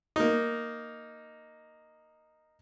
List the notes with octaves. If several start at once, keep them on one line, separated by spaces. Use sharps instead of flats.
A#3 D#4